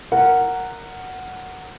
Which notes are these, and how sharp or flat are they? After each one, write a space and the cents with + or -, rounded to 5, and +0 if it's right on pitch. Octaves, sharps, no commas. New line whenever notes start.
A#4 -10 F#5 +0